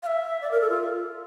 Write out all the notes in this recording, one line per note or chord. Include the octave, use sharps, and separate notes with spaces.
F5
E5
D5
A#4
A4
F4